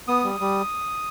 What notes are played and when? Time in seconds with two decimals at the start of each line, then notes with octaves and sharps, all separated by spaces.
0.08 B3 D#6
0.24 G3
0.40 G3